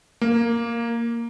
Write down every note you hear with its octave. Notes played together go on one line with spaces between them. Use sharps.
A#3